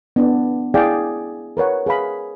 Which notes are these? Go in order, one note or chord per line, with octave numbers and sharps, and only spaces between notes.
B3 D4 D5
E4 G#4 D5 F5 G5
A#4 B4 C#5 F#5
G#4 B4 F5 B5